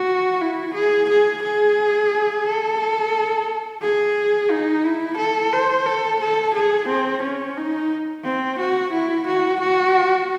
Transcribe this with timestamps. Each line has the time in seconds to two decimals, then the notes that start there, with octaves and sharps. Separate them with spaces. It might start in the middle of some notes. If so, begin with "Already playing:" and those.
Already playing: F#4
0.41 E4
0.75 G#4
1.10 G#4
1.43 G#4
2.46 A4
3.82 G#4
4.51 D#4
4.84 E4
5.18 A4
5.53 C5
5.86 A4
6.20 A4
6.55 G#4
6.88 C4
7.23 C#4
7.57 D#4
8.24 C4
8.59 F#4
8.93 E4
9.27 F#4
9.61 F#4